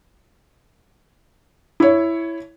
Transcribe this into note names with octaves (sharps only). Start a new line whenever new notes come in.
E4 C#5